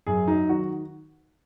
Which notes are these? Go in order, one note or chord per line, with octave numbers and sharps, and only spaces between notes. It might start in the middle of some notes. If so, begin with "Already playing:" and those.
F#2 G#4
F#3 D#4
D#3 F#4